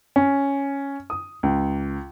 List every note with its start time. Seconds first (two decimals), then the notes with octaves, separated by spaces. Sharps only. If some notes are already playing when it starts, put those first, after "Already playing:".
0.16 C#4
1.10 D#6
1.43 C#2